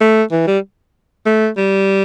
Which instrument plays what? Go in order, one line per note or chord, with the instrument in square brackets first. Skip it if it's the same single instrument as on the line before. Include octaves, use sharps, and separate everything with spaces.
[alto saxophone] A3
E3
G3
A3
G3